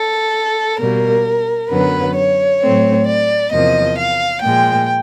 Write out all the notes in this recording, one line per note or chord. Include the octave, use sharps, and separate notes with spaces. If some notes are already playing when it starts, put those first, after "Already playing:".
Already playing: A4
B2 G3 A#3 A#4
F#2 D3 F#3 B3 B4
C#5
A2 F#3 A3 C4
D5
E2 C3 F3 A#3 D#5
F5
A#2 F3 G#3 G5